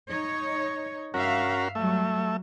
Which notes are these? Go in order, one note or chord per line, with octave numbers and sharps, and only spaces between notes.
D#4 C#5
G2 C#4 F#4 A#4 E5 F5
F#3 G3 A3 E5